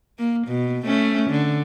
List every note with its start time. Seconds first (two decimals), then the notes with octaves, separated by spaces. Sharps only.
0.19 A#3
0.48 B2
0.85 A3 C#4
1.30 D3